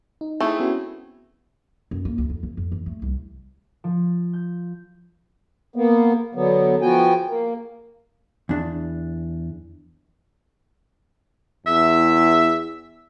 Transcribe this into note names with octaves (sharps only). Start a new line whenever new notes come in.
D#4
A3 C4 E4 G#4
B3 C#4 F#4
F#2
A#3
D2
F2
E3
F2
E3
A3
C2
F3
G6
A#3 B3
D3 F#3 B3
F3 B3 F#4 G5 G#5
A#3
E2 D4
E2 E5